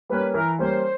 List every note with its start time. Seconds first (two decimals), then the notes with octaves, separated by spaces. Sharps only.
0.09 G3 A#3 C#4 B4
0.34 E3 A#4
0.59 G3 A#3 C#4 C5